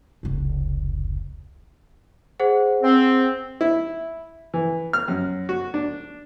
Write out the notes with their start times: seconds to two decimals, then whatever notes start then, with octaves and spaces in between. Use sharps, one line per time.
0.23 F1 C#2
2.40 G#4 C5 F#5
2.82 C4
3.61 E4
4.54 E3
4.93 F6
5.08 F#2
5.49 F#4
5.74 D4